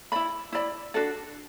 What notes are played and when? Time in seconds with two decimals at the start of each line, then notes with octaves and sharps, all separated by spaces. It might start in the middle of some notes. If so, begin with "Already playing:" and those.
0.12 E4 D5 B5
0.53 E4 D5 B5
0.94 D4 F#4 A4 D5